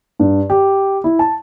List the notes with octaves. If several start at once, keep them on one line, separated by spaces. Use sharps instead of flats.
G2
G4
E4
A5